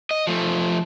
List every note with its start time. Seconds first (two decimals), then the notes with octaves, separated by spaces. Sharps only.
0.11 D#5
0.27 F3 A3